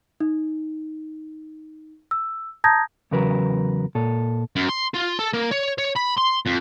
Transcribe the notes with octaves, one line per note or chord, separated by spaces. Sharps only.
D#4
E6
A5 A#5 D#6 G6 G#6 A#6
E2 C#3 F#3 A#4 B4
A#2 A4
F#2
C6
F4
A4
A#3
C#5
C#5
B5
C6
F2